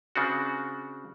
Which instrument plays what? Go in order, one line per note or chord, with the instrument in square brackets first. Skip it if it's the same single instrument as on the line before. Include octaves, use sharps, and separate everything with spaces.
[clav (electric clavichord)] C#3 C4 D4 F#4